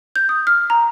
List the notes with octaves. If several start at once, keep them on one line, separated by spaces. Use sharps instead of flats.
G6
D#6
F6
A#5